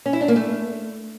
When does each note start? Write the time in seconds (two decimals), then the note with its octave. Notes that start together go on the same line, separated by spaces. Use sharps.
0.06 C#4
0.13 E4
0.21 D4
0.28 A#3
0.36 A3